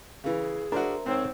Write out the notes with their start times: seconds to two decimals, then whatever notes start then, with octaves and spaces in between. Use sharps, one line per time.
0.24 C#3 E3 G#4
0.72 D4 F#4 A#4 C5 E5
1.06 G#2 C4 C#5